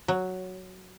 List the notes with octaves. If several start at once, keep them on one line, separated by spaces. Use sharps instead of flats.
F#3